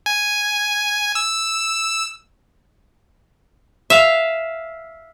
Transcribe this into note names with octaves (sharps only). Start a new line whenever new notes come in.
G#5
E6
E5 F5